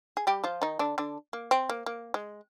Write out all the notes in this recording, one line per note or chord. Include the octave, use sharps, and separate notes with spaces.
G#4
G3 G4
F3 F4
D#3 D#4
D3 D4
D3 D4
A#3
C4
A#3
A#3
G#3